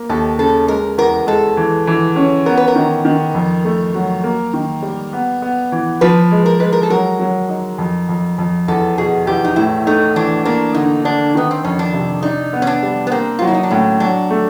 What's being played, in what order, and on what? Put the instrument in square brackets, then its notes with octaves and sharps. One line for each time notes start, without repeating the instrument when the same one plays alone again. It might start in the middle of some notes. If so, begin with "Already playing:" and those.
Already playing: [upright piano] A#3
[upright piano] D#2 [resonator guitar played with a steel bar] A4
[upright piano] C#3 [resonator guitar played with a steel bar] A4
[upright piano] G#3 [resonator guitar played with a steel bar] A#4
[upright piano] E2 [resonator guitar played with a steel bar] A#4
[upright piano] G#3 [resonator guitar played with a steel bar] A4
[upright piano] E3
E3
C#4
[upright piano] B3 [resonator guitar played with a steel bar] A#4
[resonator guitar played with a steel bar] B4
A#4
[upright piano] D#3
D#3
F2
A3
F#3
A#3
D#3
G3
B3
B3
E3
[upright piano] F3 [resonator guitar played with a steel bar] B4
[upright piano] G#3
[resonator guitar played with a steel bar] A#4
[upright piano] G#3 [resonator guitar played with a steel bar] B4
[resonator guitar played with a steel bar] A#4
A4
[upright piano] F#3 [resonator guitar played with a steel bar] A#4
[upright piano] F#3
D#4
F2
F2
F2
[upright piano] E2 [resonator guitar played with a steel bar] A4
[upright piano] B2 [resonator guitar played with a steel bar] G#4
[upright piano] E2 [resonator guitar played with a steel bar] G4
[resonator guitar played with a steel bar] D#4
[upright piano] A2 [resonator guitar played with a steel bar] E4
[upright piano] A3 [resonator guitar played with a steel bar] D#4
[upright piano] E3 [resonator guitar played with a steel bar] D4
[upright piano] A#3 [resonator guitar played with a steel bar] D4
[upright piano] D3 [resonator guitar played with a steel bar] D#4
[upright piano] D3 [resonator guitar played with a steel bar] D4
[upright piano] D#3 [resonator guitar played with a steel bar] B3
[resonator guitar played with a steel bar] C4
[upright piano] F2 [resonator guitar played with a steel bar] C#4
[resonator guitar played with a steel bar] D4
[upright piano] C3
[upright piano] D4 [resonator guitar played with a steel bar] D#4
[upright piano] B3
[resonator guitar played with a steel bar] C#4
D4
[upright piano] G3
[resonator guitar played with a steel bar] B3
[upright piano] A#3 [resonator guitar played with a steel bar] C4
[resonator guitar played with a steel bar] F4
[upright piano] F#3
[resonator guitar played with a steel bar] E4
D#4
D4
[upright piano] A2 [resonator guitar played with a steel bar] C#4
[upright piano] F#3 [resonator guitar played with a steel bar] D4
[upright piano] A3